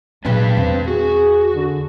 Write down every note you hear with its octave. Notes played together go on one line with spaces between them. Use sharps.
A#2 F#3 G#3 D4 B4 D5
E2 C4
F#4 G#4
D3